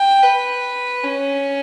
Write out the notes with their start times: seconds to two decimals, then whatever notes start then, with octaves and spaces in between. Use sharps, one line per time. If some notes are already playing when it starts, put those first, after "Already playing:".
Already playing: G5
0.23 B4
1.04 C#4